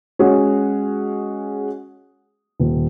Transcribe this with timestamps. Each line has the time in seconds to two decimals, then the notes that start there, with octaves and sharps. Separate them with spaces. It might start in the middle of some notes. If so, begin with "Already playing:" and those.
0.19 G#3 C#4 F#4 G#4
2.60 D#1